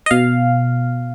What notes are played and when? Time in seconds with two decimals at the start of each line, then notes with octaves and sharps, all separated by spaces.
0.06 D#5
0.11 B2 F5